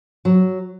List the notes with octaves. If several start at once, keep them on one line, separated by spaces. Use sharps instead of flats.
F#3